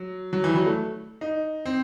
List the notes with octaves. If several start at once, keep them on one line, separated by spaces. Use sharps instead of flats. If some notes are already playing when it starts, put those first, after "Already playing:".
Already playing: F#3
F#3
E3
G3
F#3
A3
D#4
C4